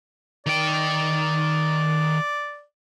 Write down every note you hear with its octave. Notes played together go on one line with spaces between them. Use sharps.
D#3 D5 G5